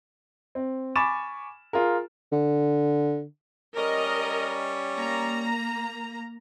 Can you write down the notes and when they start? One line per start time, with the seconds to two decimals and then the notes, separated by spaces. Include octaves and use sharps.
0.55 C4
0.96 G#5 B5 C#6 D6 A6 E7
1.73 F4 G#4 A#4
2.32 D3
3.76 G3 C#4 A#4 D#5
4.96 A#3 A#5